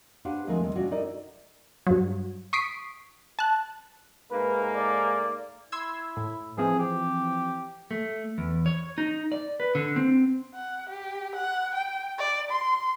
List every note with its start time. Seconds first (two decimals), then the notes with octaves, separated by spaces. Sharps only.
0.25 D4 G4 B4 C5 F5 F#5
0.47 D2 F3 G#3 A3 C4 A#4
0.62 D#2 D#3 G3
0.76 C3 G3 C#4 D4 F4 F#4
0.91 D#4 E4 A4 A#4 D5 D#5
1.87 G2 F#3
2.53 C#6 D#6 B6 C7 D7
3.39 A5 F#6
4.31 G#2 A3 A#3 B4
4.75 D5
5.72 E4 C6 E6 G#6
6.17 A2
6.58 E3 F3 C4 G#4
6.79 G4
7.91 A3
8.38 E2
8.66 C#5
8.98 D#4
9.32 D5
9.60 B4
9.75 D3
9.96 C4
10.55 F#5
10.90 G4
11.36 F#5
11.75 G5
12.18 D5
12.51 C6